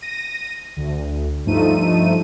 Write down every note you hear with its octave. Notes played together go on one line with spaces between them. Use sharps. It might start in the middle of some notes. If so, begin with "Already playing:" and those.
A#6 D#7
D2
G2 F3 A3 D#4 D#7